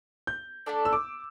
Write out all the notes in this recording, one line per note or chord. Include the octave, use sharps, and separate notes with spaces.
G6
A3 D4 A4 D5
E6
D6